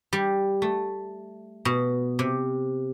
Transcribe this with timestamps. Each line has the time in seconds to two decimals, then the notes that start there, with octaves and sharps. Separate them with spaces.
0.13 G3
0.62 A3
1.65 B2
2.19 C3